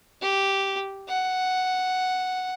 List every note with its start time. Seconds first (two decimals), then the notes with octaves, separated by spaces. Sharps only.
0.22 G4
1.09 F#5